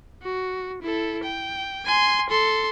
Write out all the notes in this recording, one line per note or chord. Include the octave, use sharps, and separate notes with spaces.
F#4
E4 A4
G5
G#5 C6
A4 C6